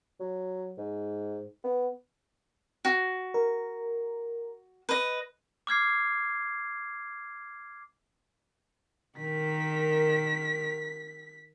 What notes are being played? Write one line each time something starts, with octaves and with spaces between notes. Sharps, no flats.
F#3
G#2
B3
F#4
A#4
B4 D#5
D6 F6 G#6 C7
D#3 A#4 B6